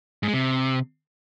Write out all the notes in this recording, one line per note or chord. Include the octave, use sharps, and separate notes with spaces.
G#2
G#3
C3